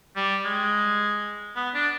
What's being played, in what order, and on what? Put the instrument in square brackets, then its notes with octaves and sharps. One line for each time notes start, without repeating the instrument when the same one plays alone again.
[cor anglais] G3
G#3
B3
D4